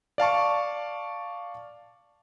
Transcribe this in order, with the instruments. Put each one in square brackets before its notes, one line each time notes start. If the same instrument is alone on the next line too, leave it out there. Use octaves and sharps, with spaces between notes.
[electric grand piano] D5 F5 A5 C#6